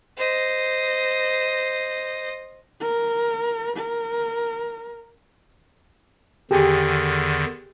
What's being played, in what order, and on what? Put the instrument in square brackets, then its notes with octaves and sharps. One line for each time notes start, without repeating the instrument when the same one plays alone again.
[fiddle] C5 D#5
[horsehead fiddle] A#4
A#4
[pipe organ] E2 D3 D#3 [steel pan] G4 G#4